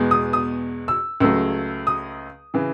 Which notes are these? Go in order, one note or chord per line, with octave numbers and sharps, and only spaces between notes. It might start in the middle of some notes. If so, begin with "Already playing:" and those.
Already playing: E2 B2 G#3
D#6
D#6
E6
C#2 C#3 F#3 A3 E6
D#6
C#3 E3